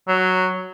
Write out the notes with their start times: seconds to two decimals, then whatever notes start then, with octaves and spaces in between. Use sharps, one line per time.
0.08 F#3